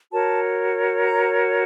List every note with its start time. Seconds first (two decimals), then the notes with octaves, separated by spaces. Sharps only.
0.10 F#4 A#4 C#5 A5
1.01 A#5